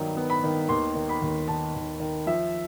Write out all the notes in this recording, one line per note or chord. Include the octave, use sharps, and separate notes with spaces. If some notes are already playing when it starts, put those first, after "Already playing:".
Already playing: G2 D#3 F#3 B3
B3
B5
D#3
D#2 C6
D#3
B5
D#2
D#3 A5
D#2
D#3
F3 E5